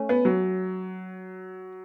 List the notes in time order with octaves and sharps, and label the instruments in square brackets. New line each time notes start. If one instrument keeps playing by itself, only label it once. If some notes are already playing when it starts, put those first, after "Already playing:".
Already playing: [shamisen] A3 C#4
[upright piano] B3
F#3